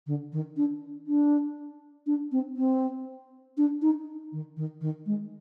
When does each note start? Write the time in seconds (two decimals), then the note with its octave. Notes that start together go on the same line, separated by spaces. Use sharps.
0.07 D3
0.32 D#3
0.57 D4
1.07 D4
2.06 D4
2.32 C4
2.57 C4
3.57 D4
3.82 D#4
4.32 D#3
4.57 D#3
4.81 D#3
5.06 G#3